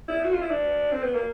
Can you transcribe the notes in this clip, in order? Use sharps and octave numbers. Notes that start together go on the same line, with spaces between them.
E4
F#4
F4
E4
D4
C4
B3
A#3